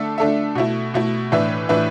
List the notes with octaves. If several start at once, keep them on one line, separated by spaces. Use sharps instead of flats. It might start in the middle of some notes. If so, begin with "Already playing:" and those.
Already playing: D3 A3 D4 A4 E5
D3 A3 D4 A4 E5
B2 A3 E4
B2 A3 E4
A2 E3 D4 B4 E5
A2 E3 D4 B4 E5